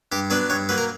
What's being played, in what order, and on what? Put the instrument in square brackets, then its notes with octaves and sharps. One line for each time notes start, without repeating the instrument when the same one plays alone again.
[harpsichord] G2 G4
F#3 B3 D4 B4
G2 C#5
F#3 A#3 B4
A#4